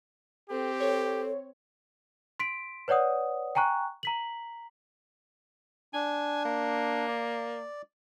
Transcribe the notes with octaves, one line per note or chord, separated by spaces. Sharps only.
C4 G4 A4
A4 C#5
C6 B6 D7
B4 C#5 D5 F#5 D#6
G5 G#5 A#5 C#6 F#6
A#5 B6 F#7
D4 G#5
A#3
D5